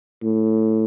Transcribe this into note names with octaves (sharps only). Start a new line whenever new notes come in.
A2